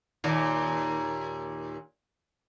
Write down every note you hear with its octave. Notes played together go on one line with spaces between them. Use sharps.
D#2 A#2